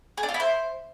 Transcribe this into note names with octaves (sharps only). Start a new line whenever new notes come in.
G#4
D4
F4
E4
C5